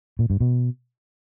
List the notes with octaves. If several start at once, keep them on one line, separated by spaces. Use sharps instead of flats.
A#2
G2
B2